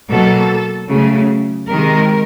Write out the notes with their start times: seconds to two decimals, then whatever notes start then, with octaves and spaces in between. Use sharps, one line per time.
0.10 B2 F#3 A#3 A4
0.90 C#3 F#3 A3
1.69 C3 D#3 G#3 A#4